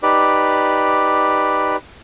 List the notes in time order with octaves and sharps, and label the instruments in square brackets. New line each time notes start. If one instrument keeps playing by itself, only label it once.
[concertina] D#4 G4 B4 D5